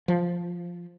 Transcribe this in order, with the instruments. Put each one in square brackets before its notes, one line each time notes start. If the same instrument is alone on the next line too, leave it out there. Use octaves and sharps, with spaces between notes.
[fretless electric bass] F3